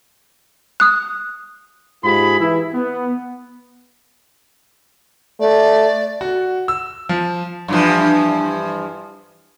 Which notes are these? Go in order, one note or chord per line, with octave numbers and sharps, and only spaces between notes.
D#6 F#6
G#2 F4 G4 G#4 B5
E3 E4
B3
A3 D5
F#4
E6
F3
G2 E3 F3